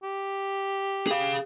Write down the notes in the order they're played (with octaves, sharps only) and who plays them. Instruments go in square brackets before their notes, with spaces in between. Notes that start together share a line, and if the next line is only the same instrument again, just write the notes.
[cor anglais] G4
[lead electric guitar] G#4 F5